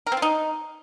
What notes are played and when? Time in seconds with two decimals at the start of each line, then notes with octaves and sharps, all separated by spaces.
0.07 A#4
0.12 C4
0.17 F4
0.22 D#4